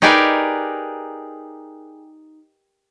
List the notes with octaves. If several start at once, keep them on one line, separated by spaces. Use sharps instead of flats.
D#4 G4 G#4 A#4 B4 D5